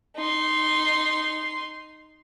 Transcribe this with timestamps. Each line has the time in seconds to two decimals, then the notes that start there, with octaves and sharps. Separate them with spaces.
0.16 D#4 C6